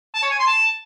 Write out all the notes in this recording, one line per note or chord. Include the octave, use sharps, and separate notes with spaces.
A5
C#5
G#5
C6
A5